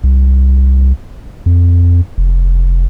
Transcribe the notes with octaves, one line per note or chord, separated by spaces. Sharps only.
C2
F2
F1